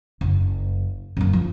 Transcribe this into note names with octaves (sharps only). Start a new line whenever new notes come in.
F#1
F#2 A#3
F3